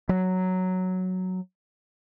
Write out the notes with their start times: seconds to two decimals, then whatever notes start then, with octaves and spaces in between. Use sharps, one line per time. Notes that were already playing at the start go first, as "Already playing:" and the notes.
0.09 F#3